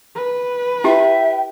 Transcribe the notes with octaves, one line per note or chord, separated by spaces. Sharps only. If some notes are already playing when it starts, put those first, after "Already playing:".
B4
E4 G4 E5 G5